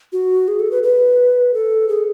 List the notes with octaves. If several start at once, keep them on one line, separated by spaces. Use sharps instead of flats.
F#4
G#4
A4
B4
B4
A4
G#4